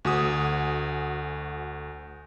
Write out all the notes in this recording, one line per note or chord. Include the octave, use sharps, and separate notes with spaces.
D2 F#4 G#5 D#6